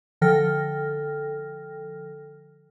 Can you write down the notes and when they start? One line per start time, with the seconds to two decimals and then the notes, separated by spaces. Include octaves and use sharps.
0.21 D3 F3 A4 G5 F6 A#6